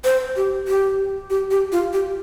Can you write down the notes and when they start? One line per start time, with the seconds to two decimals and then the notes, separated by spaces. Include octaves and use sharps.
0.04 C5
0.36 G4
0.68 G4
1.30 G4
1.51 G4
1.72 F4
1.93 G4